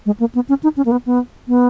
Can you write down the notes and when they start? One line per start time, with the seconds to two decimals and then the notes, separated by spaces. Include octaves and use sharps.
0.06 G#3
0.20 A#3
0.35 B3
0.49 C#4
0.63 D#4
0.77 C#4
0.86 A#3
0.92 B3
1.06 B3
1.48 B3